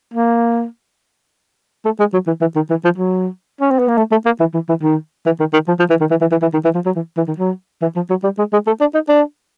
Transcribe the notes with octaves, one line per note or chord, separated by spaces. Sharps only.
A#3
A3
G#3
F#3
E3
E3
D#3
E3
F3
F#3
C#4
C4
B3
A#3
A3
A3
A#3
E3
E3
E3
D#3
E3
D#3
D#3
F3
F3
E3
D#3
E3
E3
E3
E3
D#3
E3
F3
F#3
E3
E3
D#3
F#3
E3
F3
F#3
G3
G#3
G#3
A3
D4
D#4
D4